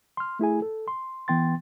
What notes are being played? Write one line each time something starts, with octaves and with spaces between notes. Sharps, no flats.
C6 F6
A3 E4 G#4 G#5
A4
C6
E3 B3 G5 C6 A6